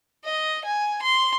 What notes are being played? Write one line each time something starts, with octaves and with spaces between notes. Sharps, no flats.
D#5
G#5
C6